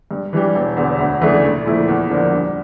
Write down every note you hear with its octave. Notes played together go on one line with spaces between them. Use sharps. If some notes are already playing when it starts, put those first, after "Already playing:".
G2
E3 G3 D4 G4
E1
E2 D3
D2
C#3 E3 A3 D4
A#1
A#2 F3 A3 E4
E2
D3 F3 A#3 D4
G2